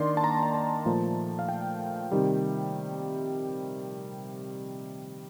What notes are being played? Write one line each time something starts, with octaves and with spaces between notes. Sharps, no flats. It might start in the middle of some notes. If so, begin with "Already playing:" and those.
Already playing: D#3 A#3 D4 D5 C6
A5
A#5
A#5
A5
A#2 F3 A3
F5
G5
C3 D#3 G3